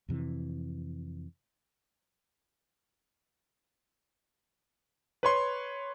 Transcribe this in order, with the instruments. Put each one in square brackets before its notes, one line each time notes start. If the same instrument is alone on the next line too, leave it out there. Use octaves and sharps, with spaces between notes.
[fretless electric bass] F2 C3 E3
[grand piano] B4 C#5 C6